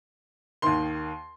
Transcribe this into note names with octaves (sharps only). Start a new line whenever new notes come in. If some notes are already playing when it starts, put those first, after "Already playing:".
D#2 D#3 C6